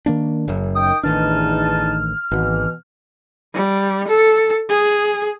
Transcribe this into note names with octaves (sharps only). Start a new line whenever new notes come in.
D#3 A#3 D4
F#1 F#2
D#3 G5 D#6
A1 E2 D#3 D4 D#4 A5 F6
G#1 B2 E3
G3
A4
G#4